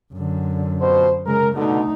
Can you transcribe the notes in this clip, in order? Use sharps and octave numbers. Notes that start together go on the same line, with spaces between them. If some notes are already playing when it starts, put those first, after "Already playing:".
F#2 D3
F2 B2 C5
C#3 G#3 A#4
B2 D3 A3 D#4